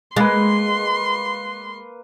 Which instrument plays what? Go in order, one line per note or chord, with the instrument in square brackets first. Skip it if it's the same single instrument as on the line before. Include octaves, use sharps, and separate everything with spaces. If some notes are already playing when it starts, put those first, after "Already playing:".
[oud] G#3 [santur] A#3 B4 [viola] C6